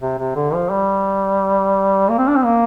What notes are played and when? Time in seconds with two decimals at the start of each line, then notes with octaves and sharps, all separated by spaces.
0.01 C3
0.18 C3
0.36 D3
0.54 F3
0.71 G3
2.10 A#3
2.18 C4
2.28 D4
2.36 C4
2.45 A#3